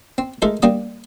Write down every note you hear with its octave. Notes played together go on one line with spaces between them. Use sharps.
C4
G#3 A3 D#4 A4 A#4
G3 A#3 D4 A5 D#6